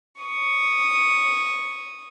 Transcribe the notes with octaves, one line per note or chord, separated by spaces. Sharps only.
C#6 D#6